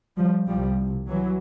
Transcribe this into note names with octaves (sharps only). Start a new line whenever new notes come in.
F3 G3
C2 C3 F3 G3
E3 F#3